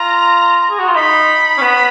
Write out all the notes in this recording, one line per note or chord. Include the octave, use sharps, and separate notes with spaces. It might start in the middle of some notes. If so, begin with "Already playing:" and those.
Already playing: F4 A#5
G#4
F#4
F4
D#4 B5
C#4
B3